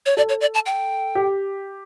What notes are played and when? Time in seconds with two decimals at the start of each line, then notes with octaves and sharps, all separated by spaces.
0.06 C#5
0.17 A4 D5
0.29 C#5
0.41 D5
0.54 A5
0.66 G5
1.15 G4